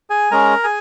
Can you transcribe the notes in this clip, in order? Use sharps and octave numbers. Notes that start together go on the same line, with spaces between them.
G#4 G#5
G#3 C#4 G#4 A#4 A#5
G#4 G#5